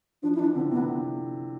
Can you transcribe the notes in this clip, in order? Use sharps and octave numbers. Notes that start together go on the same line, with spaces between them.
F3 D4
E4
E3 D4
D3 C4
C3 B3